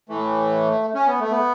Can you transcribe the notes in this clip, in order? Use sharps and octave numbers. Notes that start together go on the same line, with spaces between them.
A2 E3 A3
C#4
B3
A3
B3